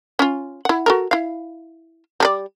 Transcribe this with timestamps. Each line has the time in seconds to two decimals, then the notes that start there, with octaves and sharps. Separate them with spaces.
0.19 C#4 F4
0.65 E4 F#5
0.86 F#4 A4 A#4
1.11 E4 F5
2.20 G3 A4 D5